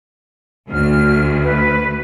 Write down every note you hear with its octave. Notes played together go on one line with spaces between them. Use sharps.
D2 F6
B4